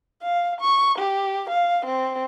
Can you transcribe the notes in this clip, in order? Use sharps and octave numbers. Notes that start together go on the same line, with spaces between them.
F5
C#6
G4
F5
C4